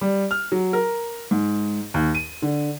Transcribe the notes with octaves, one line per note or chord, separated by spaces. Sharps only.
G3
F6
F#3
A#4
G#2
D#2
D#7
D3